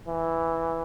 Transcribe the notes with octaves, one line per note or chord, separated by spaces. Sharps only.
E3